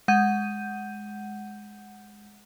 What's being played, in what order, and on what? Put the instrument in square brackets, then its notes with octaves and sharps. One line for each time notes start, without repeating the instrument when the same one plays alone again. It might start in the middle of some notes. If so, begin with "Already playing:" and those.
[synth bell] G#3 F#5 G6 D#7